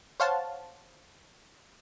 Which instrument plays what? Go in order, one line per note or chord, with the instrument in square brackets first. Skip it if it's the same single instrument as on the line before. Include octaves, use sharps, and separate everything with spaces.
[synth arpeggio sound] C5 C#5 F5 F#5 A5